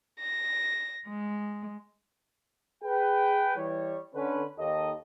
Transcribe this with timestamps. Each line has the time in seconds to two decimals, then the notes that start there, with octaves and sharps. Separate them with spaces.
0.20 A#6
1.08 G#3
2.84 G#4 B4 G5
3.57 E3 G3 C#5
4.15 D3 C#4 B4
4.59 D#2 A4 D#5